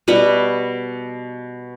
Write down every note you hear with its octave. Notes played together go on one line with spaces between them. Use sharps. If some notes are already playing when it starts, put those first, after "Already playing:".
B2 G3 B4 F#5